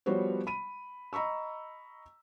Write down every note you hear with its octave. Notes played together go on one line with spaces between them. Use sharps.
F3 G3 B3 F#4 C5 C#5
B5 D#7
D#5 A#5 B5 C#6 E6